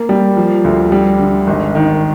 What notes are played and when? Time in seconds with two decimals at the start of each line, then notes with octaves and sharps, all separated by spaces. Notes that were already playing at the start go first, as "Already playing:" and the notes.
Already playing: A#3
0.09 G3
0.37 F3
0.64 D2
0.92 G3
1.19 D3
1.47 G#1
1.75 D#3